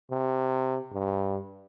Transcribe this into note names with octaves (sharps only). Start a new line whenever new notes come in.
C3
G2